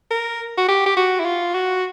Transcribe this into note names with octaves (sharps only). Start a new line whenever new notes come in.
A#4
F#4
G4
G4
F#4
E4
F4
F#4